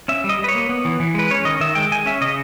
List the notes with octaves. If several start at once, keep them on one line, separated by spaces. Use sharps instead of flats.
C#4 E5
G3
D#5
G3
B4
C#5
A#3
B3
E3
E3
G#3 B4
C#4 C#5
D#3 D#5
D#3 E5
G#3 G5
G#3 G#5
C#4 E5
C#3 D#5